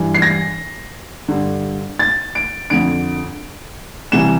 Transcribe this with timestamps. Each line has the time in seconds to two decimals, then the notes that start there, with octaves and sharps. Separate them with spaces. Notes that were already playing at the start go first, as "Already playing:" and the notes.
Already playing: G2 E3
0.14 C7
0.22 A#6
1.28 G2 D3
1.99 A6
2.35 D7
2.70 F2 D3 D7
4.12 C2 C3 E3 E7